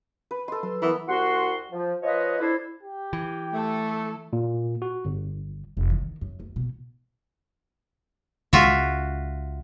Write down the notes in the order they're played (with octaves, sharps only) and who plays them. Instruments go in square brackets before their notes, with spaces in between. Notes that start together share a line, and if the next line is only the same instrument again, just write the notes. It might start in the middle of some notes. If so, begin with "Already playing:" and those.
[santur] B4
[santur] A4 C6 [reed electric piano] D#5
[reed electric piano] F#3 B4 [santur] C6
[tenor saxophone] E3 [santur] B3 A#4 B5
[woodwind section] C2 F#4 F#5 C6
F3
F3 F4 B4 C#5 D#5
D4 E4 A4 C5
[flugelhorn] G4
[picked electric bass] E3
[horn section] A3 [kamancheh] A4
[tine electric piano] A#2
F#4
G1
[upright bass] F1
E3
D#3
F#2
D2
B2
[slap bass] C#2 G#3 [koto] F4 F#4 E5